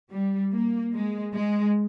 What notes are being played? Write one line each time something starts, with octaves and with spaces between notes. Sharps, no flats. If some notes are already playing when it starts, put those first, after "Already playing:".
G3
A#3
G#3
G#3